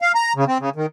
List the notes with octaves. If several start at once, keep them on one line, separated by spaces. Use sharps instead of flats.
F5
A#5
C#3
C4
C#3
D#3